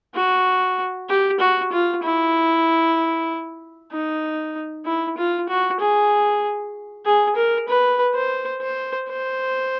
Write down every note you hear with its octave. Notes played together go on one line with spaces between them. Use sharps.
F#4
G4
F#4
F4
E4
D#4
E4
F4
F#4
G#4
G#4
A#4
B4
C5
C5
C5